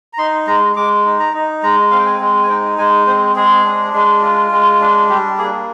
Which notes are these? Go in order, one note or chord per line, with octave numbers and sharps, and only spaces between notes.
A#5
D#4 C6
G#3 A#5
G#3 D6
D#4
A#5
D#4
G#3 A#5
C4 F5
G5
G#5
G#3
G#5
D#4 G5
G#3 G#5
C4 C5
G#3 G#4
D4
G#3
F4
G#3
D4
G3 G4
A#3 G#4